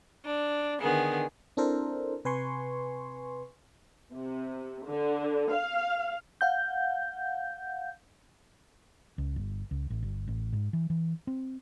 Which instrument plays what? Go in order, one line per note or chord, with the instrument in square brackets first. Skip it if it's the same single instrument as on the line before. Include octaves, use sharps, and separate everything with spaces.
[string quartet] D4
D3 D#3 B3 G#4
[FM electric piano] C4 D4 E4 A4 A#4 C5
C3 B4 G#5 C6 C#6
[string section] C3
D3
F5
[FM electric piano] F5 F#5 G6
[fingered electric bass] C#2
G1
C#2
A1
G1
A1
G#2
E3
E3
C4